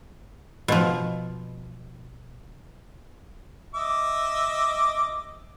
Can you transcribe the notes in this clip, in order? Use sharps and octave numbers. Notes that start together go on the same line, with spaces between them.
B2 F3
D#5 E5 D6